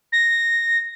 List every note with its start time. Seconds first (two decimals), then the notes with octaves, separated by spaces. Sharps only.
0.12 A#6